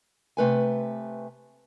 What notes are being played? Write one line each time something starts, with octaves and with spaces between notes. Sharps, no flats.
C3 A3 B4 G#5